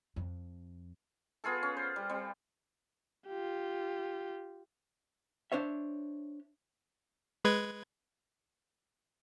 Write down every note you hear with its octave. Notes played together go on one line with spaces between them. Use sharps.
F2
B3 F4 G#4 A4
C#4
C5
G3
G3 C4
F4 G4
D4 C5 C#5 E5
G#3 B4 G#6